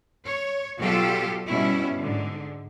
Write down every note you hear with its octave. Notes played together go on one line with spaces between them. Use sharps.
C#5
B2 F#3 F4 G4 A4
G2 B2 G3 C#4 E4
G#2 D3